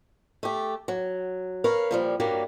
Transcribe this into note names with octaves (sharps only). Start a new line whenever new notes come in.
A3 G4
F#3
A#4 B4 C#5 F5
A#2 F3 G3
G2 F#3 G3 A#3